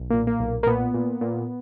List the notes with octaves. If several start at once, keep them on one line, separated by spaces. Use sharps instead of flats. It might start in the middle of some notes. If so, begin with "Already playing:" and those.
Already playing: B1
A#2 A#3
A#3
B1
A#3
A#2 B3
A#2
A#2